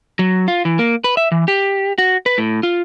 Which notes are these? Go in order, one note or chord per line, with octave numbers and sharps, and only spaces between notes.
F#3
F4
E3
A#3
B4
E5
E3
G4
F#4
B4
A2
F4